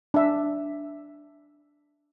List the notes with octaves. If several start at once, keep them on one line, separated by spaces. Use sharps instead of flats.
D4 E5